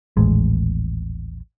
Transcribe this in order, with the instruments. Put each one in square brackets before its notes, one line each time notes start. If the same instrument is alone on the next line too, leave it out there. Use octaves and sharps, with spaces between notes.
[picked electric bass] D#1 A1 G#3